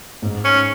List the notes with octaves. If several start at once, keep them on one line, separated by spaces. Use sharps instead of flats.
G#2
C#4